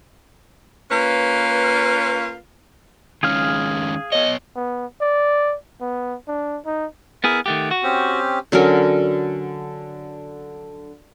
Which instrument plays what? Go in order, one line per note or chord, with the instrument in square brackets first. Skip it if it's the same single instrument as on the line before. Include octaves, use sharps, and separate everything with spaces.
[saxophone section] A#3 C#4 F4 B4
[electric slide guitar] D#3 G#3 C#4 [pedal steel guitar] G#4 F5 F6
[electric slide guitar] B3 C#5 [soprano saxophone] D#5
[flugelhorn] B3
D5
B3
D4
D#4
[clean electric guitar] B3 E4 G#4 [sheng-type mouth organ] A#4 E5
[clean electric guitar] D#3 A3 G4 [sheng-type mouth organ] F#5
[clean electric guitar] F#4
[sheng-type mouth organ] C4 C#4 G4
[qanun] D3 F#3 C#4 A#4